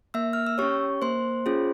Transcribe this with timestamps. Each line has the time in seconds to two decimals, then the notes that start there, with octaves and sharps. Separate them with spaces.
0.14 A#3 E5 E6
0.33 F6
0.47 E6
0.58 C#4 G4 C#5 C#6
1.02 A#3 C5 C6
1.46 C#4 F4 G#4